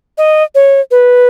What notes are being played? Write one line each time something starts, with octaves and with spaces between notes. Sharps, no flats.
D#5
C#5
B4